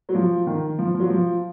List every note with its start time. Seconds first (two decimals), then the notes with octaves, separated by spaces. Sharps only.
0.09 F#3
0.15 F3
0.47 D#3
0.79 F3
0.94 F3
1.00 F#3
1.10 F3